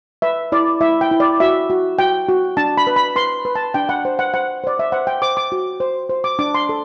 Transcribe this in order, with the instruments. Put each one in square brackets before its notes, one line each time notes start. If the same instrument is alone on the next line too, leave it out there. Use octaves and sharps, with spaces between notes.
[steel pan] B4 E5
E4 D5
E4 E5
G5
E4
D5
F#4 E5
F#4
F#4 G5
F#4
D4 A5
B5
B4
B5
B4 C6
B4
A5
D4 G5
F#5
C5
F#5
C5 F#5
C5 D5
E5
C5 F#5
G5
C5 D6
D6
F#4
C5
C5
D6
D4 D6
C6
A4